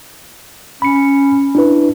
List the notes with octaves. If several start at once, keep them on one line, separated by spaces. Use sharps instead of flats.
C#4 B5 C#7
D4 E4 B4